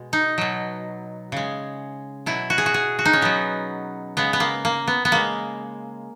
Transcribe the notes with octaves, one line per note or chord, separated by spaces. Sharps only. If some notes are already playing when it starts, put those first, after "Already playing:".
Already playing: B2 G#3
D#4
B2 F#3
C#3 G#3
B2 F#3 E4
F#4
G#4
F#4
G#4
F#4
D#4
C#4
B2 F#3 B3
C#3 G#3 B3
B3
A#3
A#3
B3
B3
C#3 G#3 A#3